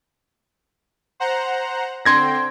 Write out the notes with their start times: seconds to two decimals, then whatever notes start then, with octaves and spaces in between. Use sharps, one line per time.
1.20 C5 F#5 A#5
2.05 D3 C4 G5 C6 G#6 A#6